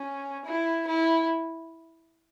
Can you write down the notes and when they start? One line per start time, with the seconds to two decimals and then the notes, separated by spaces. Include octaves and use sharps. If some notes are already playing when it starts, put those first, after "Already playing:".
Already playing: C#4
0.45 E4
0.87 E4